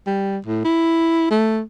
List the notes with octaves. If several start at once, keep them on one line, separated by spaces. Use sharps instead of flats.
G3
A2
E4
A3